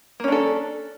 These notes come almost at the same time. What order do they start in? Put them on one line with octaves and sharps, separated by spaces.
A#3 C#4 D4 A4